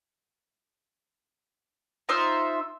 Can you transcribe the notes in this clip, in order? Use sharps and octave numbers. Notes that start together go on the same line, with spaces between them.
D#4 F4 C5 E5